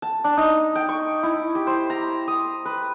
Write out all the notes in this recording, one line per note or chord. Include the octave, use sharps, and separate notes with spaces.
A5
D4
D#4
G5
C#6
E4
G4
C5
A#5
D#6
B4